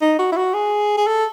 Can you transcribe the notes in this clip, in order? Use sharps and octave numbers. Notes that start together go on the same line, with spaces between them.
D#4
F#4
E4
F#4
G#4
G#4
A4